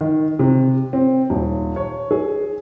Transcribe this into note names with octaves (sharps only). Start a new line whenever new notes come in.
D#3
C3
C4
D#1
C#5
G#4